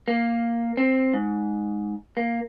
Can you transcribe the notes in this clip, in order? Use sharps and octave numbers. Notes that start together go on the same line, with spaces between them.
A#3
C4
G#2
A#3